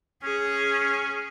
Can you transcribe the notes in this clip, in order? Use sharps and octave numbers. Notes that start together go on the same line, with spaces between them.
C#4 G#4